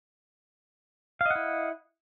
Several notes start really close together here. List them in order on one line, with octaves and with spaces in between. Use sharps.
F5 D#5 F#5 E4